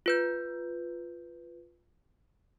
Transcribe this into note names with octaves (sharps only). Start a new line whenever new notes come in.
F4 B4 G6